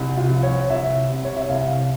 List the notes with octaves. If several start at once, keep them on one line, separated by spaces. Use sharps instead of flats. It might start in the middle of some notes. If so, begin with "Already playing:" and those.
Already playing: C2
F4
F3
C#5
C2 E5
C3
C#5
E5
C2 F5